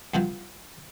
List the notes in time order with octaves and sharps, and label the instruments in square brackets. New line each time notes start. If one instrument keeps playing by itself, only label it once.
[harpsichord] G2 C3 F3 F#3